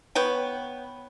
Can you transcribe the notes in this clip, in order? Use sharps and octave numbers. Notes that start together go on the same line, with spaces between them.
B3 C#5 G5